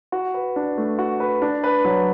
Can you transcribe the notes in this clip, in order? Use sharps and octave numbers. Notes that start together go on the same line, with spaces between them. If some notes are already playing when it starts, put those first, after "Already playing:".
F#4
B4
D4
A3
F#4
B4
D4
B4
F#3